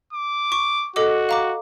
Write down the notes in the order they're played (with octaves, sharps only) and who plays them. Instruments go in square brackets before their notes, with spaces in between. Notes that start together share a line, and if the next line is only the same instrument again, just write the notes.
[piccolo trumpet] D6
[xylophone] C#6
[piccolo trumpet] F#4 [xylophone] A4 D#5 D6
[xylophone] F5 A#5 D6